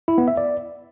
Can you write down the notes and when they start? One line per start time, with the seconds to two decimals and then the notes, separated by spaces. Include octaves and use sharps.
0.08 E4
0.18 B3
0.28 E5
0.37 D5